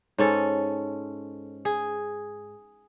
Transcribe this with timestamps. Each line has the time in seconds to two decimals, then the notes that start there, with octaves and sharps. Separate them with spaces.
0.18 G#2 C#4 A4
1.65 G#4